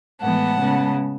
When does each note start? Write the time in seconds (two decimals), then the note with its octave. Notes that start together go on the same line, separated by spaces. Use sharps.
0.22 A2 E3 G#3 B3 F#5 A5
0.58 C#3 G#3 B3